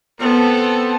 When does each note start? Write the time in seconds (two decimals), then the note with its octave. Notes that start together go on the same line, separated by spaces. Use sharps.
0.20 B3 C4 A4